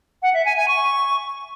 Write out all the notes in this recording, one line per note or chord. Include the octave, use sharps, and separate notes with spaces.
F#5
E5
G#5
G#5
C#6